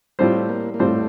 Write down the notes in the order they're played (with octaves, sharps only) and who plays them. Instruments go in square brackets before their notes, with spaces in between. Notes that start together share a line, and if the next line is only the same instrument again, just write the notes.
[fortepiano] A2 G3 C4 F4 C5 [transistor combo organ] A3
[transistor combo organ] A#3
A#3
[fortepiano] A2 G3 C4 F4 C5 [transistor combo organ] A3